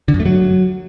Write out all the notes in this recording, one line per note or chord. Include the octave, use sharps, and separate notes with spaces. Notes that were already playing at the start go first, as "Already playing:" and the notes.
D3
F#2
A3
F#3